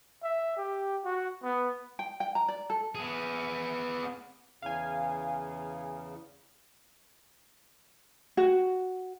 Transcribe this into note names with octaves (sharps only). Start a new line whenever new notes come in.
E5
G4
F#4
B3
G5
G5
A#5
D5
A4
B3 G#4
E2 C#3 F5 G#5
F#4